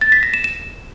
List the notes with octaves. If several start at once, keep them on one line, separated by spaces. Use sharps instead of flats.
A6
B6
A#6
E7
E7